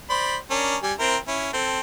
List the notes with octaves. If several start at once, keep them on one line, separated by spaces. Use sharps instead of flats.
C5 D5 B5
C#4 D4 A#4
G3 G#5
C4 E4 A#4
C#4 E4
C4 A4